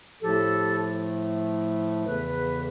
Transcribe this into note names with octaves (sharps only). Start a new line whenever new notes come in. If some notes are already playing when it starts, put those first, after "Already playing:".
A2 F3 A3 G4 A4
E2 C#3 E3 A4 B4